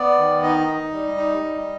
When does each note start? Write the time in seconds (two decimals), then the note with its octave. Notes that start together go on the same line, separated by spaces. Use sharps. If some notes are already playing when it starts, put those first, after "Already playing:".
Already playing: B3 D5
0.18 D#3
0.43 D#4 D#5
0.67 D#4
0.93 G3
1.17 D#4
1.42 G3